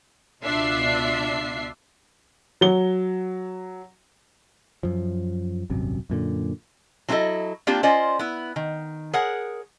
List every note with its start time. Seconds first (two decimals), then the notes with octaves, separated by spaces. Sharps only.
0.42 C#2 B2 D4 F4 E5 C7
2.61 F#3 G7
4.83 F#2 F3
5.70 D#1 G#1 F#2 C3
6.10 F#2 A#2 D3
7.09 F#3 C4 E4 G4 A4 D#5
7.67 A#3 C4 D4 F4 G4
7.83 C#4 F4 C5 D5 D#5
8.19 B3 E4
8.56 D#3
9.14 G#4 A#4 C#5 F#5